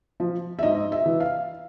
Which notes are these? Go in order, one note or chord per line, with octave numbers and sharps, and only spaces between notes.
F3
E5
G#2 D#5
E5
E3
F5